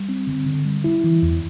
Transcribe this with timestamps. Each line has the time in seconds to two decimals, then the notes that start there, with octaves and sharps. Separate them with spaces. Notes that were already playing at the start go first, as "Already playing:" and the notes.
Already playing: G3
0.09 C4
0.27 D3
0.46 D3
0.65 G3
0.84 E4
1.04 E3
1.23 E2